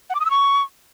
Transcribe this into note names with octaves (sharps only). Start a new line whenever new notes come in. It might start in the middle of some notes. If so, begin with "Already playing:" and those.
F#5
D6
D#6
E6
C#6